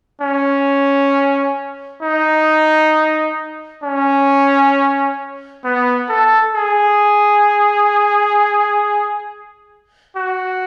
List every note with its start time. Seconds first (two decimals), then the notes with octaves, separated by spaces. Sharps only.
0.21 C#4
2.02 D#4
3.83 C#4
5.64 B3
6.09 A4
6.55 G#4
10.16 F#4